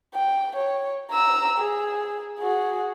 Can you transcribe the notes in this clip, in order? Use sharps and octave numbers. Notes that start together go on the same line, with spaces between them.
G5
C#5
A#5 E6
G#4
F#4 G#4